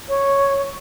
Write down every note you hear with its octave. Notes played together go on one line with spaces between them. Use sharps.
C#5